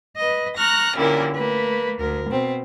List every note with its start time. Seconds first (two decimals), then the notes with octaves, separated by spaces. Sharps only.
0.17 B4 D#5
0.57 A#5 C#6 F6 F#6 A#6
0.95 A#2 D3 G3 C#4 E4 A#4
1.34 A3 A#3 B4
1.99 D2 A#4
2.30 B2 C4